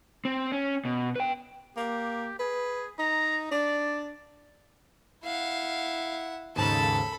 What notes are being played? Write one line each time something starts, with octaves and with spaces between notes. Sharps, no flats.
C4
C#4
B2
B4 G5
A#3 G4
G#4 B4
D#4 A#5
D4 D5
E4 F5 F#5
D#2 G#2 C#3 A4 A5 B5